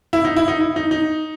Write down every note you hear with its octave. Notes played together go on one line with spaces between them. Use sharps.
E4
D#4
E4
D#4
E4
D#4
D#4